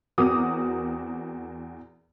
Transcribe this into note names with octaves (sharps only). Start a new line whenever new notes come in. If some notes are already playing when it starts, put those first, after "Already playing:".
E2 C4 F#4 A#4 D6 D#6